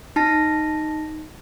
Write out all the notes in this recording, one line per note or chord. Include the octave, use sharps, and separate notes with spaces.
D#4 A5 A#6